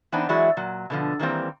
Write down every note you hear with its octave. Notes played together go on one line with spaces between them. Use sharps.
E3 B3 C4 D4 D#4
E3 F#3 G#3 E4 F#4 D5
A#2 F#3
B2 D3 F3
D#3 E3 G3 A#3 C4